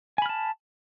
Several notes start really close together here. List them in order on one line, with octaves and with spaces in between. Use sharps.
G#5 B5 F6 A5